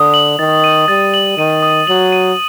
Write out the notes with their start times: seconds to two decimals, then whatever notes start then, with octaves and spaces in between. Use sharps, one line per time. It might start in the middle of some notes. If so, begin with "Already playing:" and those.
Already playing: D3 D#6
0.14 F#7
0.39 D#3 A6
0.64 D#7
0.88 G3 A6
1.14 F#7
1.37 D#3 D#7
1.63 D#6
1.87 F#3 F#7
2.12 D#7